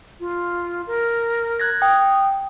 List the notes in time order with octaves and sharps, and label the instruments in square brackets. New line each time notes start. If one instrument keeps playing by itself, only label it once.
[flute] F4
A#4
[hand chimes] F#6 G#6 A#6
[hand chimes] G5 [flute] D#6